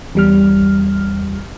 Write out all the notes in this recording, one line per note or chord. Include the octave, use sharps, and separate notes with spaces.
E2 G3 F6